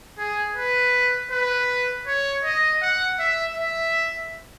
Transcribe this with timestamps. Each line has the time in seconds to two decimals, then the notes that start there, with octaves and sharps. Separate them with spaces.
0.19 G#4
0.56 B4
1.31 B4
2.07 C#5
2.44 D#5
2.82 F#5
3.20 E5
3.57 E5